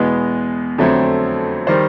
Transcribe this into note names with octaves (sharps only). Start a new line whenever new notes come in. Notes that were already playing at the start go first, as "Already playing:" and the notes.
Already playing: E2 B2 G#3 B3 D#5
F2 D3 F#3 A3 C4
D#3 G3 C5